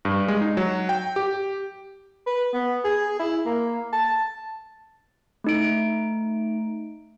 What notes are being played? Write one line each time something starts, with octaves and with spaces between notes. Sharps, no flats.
G2
G#3
D#4
F#3
G5
G4
B4
B3
G#4
E4
A#3
A5
A3 D#4 D7